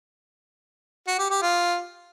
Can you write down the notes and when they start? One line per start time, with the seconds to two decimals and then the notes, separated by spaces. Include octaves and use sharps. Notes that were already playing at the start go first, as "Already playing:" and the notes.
1.07 F#4
1.18 G4
1.30 G4
1.42 F4